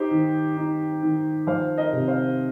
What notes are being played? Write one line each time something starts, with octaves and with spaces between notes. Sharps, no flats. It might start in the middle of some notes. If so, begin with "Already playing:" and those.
Already playing: D#4 G4 C5
D#3
D#4
D#3
F3 C5 F5
A#4 D#5
C3
C5 F5